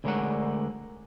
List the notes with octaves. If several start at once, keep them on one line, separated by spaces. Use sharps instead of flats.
D2 D3 G#3 A#4 C#5 F#5